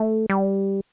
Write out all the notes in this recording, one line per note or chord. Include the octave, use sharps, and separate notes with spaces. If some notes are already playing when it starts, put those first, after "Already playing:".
Already playing: A3
G3